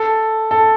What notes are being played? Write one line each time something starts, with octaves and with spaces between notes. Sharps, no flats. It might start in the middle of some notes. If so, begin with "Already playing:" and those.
Already playing: A4
A4